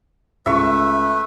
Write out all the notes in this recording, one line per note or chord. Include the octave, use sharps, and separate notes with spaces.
C#2 A3 B4 E5 C#6